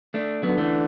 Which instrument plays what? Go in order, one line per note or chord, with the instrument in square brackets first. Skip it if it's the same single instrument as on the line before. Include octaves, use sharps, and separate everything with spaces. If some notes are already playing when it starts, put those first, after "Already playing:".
[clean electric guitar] A3 D4
[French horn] D3 [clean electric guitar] F#3 B3
[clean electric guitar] E3 A3